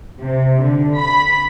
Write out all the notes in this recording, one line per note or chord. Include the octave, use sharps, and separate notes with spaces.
C3
D3
B5